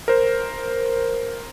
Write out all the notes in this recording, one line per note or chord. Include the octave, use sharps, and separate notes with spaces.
A#4 C5